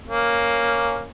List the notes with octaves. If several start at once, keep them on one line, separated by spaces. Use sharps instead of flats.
A#3 C#4